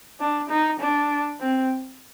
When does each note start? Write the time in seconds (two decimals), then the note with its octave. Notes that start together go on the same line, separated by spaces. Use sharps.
0.20 D4
0.49 D#4
0.80 D4
1.40 C4